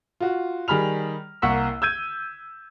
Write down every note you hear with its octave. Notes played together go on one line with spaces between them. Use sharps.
F4 F#4
D#3 G3 G#4 B5 F6 F7
C2 A#3 F#5 C#6 E6 B6
E6 G6 G#6 D#7